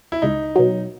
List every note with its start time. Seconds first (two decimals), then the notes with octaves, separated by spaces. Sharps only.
0.12 E4
0.22 C#2 D#4
0.56 B2 F#3